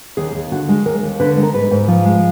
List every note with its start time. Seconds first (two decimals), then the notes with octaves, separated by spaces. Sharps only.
0.17 D#2 G#4
0.35 D#2
0.52 D3 F#4
0.69 G#3
0.86 D#2 A#4
1.03 D#2
1.20 D3 B4
1.37 G#3
1.43 A#4
1.54 G#2 B4
1.71 G#2
1.88 F3
2.05 G#3